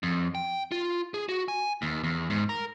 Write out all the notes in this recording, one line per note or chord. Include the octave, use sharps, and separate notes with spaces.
F2
G5
F4
G#4
F#4
G#5
D#2
E2
G#2
A#4